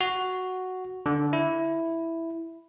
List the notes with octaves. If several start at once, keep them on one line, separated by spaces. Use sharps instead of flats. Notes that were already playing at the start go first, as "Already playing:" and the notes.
F#4
D3
E4